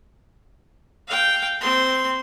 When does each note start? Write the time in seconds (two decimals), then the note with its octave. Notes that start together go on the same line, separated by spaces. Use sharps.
1.08 F5 G5
1.61 C4 C6